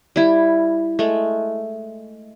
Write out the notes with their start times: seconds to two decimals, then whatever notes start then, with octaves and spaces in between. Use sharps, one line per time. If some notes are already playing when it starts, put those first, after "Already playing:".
0.16 G3 E4
0.99 G#3 A3